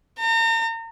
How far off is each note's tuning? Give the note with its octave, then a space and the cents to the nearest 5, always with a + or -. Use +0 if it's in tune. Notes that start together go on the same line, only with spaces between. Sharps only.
A#5 -40